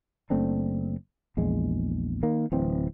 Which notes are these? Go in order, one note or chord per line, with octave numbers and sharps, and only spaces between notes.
F#1 A3 C4 D4
A#1 E2 G#3
D#3 A#3
D1 E3 C4